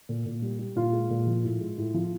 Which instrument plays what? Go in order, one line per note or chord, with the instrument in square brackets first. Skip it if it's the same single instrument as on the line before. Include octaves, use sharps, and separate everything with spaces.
[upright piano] A#2
A#2
G3
G3
A#2 F4
G#3
A#2
F3
A2
G#3
A2
F3